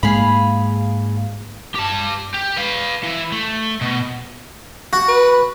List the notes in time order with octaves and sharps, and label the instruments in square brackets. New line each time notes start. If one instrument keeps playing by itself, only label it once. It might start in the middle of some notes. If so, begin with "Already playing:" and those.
[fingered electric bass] G#2 G#3 A#3 [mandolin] G#4 F5 B5
[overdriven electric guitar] G4 A5
G4
B4 F5
E3
A3
B2
[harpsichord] F#4
[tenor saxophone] B4